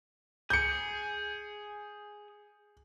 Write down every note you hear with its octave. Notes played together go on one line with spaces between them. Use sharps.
G#4 G6 C#7